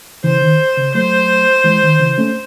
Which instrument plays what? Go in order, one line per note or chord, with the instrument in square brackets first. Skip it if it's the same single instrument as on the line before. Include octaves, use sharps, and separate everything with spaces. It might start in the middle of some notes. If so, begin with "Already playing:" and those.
[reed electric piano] C#3 E3 [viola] C5
[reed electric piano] D#3
C#3
[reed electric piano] F#3 A3 [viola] C5
[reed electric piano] E3 G#3
D#3
C#3 E3
A3 C#4